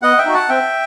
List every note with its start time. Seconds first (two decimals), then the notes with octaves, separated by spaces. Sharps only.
0.02 B3 D#5 F#5
0.18 E5 G5
0.25 D#4 F#4
0.34 F#5 A5
0.49 C4 E5 G5